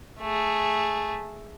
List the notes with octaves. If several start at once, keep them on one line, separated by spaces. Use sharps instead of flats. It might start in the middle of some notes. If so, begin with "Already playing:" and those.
A3 G#4